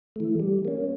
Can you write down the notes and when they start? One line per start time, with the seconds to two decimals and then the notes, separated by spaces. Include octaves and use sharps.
0.16 E3 A3
0.40 G3
0.65 A#3 C#4